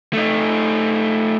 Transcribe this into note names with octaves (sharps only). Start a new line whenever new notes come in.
A3 D#4